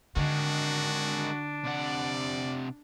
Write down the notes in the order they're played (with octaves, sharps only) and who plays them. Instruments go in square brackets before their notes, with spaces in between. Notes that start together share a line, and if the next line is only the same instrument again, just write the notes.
[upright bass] D3 [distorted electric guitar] D#3 G#3 [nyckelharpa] D4 [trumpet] F#4
[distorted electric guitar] C3 F#5 [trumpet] D5